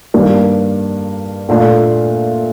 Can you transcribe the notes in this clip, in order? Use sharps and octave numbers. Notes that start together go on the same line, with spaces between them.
G2 D#3 G3 A#3 D4
A#2 A3 D4 F4